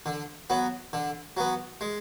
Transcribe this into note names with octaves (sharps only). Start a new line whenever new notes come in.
D3
F#3 B3
D3
F#3 B3
G#3